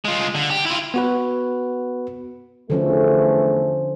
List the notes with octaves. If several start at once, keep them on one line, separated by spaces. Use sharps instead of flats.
G#3 F4
D3
G4
E4 F4
B3 F#4 B4
E2 D3 F3 A3 C#4